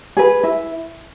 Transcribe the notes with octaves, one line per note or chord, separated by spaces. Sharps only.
G#4 B4
E4